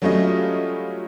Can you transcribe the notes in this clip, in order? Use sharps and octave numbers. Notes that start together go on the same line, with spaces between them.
F#3 G3 A3 C#4 F4 D#5